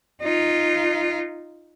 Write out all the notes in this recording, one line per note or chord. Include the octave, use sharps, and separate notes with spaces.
D#4 F4